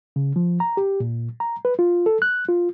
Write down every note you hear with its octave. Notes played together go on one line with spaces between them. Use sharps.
C#3
F3
A#5
G4
A#2
A#5
B4
F4
A4
F#6
F4